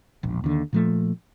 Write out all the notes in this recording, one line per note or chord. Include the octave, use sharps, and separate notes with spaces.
E1 A#1
D#2 D3
A#2 F3 A3